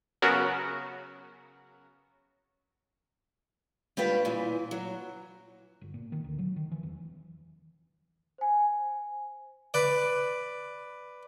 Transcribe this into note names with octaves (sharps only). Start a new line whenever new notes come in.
C#3 F#3 B3 F#4 A#4
G3 D4 F4 F#4 B4 G5
A#2 E3
F#3
G1
A#2
D#3
D2
F#3
D#3
E3
E1
C5 G#5
B4 D5